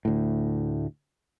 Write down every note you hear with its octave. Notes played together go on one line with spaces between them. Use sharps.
D2 A2